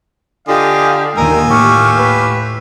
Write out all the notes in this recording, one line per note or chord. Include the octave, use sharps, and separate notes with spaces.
D3 F4 G4 D#5 F5 G#5
D#2 D#3 D#4 F4 A#4 G#5 E6
A2 G4 C#6 F6
B4